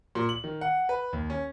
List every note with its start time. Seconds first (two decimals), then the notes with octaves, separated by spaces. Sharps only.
0.15 A#2
0.29 F#7
0.44 D#3
0.61 F#5
0.89 B4
1.13 D#2
1.30 C#4